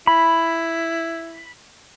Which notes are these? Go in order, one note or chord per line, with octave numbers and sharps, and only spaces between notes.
E4 B5